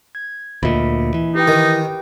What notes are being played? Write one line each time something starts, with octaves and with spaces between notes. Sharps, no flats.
G#6
D2 A#2 D#5 E5 B5
E3
D#4 G4 B4 G5
D#3